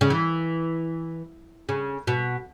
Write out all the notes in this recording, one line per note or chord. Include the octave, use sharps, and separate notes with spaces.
C#3
E3
C#3
B2